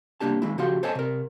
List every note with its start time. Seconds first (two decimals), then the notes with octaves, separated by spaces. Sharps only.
0.20 C2 C#3 A#3 D4 G4 A5
0.42 D#3 G#3 E4
0.58 C#3 F3 F#4 G4 F5 C6
0.83 A4 C5 C#5 D#5 G#5 A5
0.95 C3 A#4